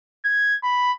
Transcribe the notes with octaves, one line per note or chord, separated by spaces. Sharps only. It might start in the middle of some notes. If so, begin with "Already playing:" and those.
G#6
B5